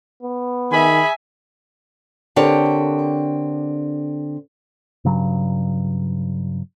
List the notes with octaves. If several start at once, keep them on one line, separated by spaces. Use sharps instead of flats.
B3
D#3 G#4 E5 G#5 B5
D3 C4 D4 G4 A#4 C#5
G2 C#3 F#3